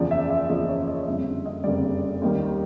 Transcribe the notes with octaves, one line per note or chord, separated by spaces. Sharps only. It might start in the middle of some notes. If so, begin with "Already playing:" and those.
Already playing: F#1 E2 C#3 F3 D5
E5
E5
F#1 E2 C#3 F3 D#5
C#5
D#5
F#1 F2 D3 G3 E5
D#5
F#1 F2 D3 G3 D5
D#2 D#3 G3